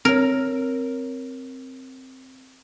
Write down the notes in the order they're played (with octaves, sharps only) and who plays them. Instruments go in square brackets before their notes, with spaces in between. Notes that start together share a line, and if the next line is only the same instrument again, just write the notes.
[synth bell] C4 C#5 [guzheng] A#4